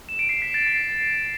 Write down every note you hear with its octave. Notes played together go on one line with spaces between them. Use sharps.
E7
D7
C7
B6
A6
C7